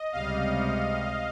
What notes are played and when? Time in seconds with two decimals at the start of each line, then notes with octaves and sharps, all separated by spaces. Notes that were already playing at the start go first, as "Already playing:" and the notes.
Already playing: D#5
0.12 C#2 C3 G3 F5